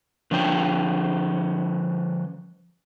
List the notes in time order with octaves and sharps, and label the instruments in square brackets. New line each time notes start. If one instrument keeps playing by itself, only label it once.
[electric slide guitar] D3 F3 C#4 D4 G5